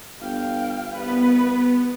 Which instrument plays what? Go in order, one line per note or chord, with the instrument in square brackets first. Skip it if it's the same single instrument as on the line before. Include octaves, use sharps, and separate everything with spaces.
[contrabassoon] G1 [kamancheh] F5 G5
[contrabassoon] C2 [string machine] B3 [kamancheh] B4